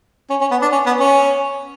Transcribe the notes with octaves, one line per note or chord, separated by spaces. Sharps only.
C#4
C#4
B3
D4
C#4
B3
C#4